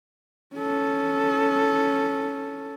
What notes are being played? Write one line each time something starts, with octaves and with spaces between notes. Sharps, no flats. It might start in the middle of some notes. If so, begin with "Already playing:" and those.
C#4 A4